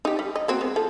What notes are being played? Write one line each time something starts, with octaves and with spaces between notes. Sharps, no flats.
D#4 G4
G3
D#5
A#3 C4 F#4
G#3 B3
F3 A4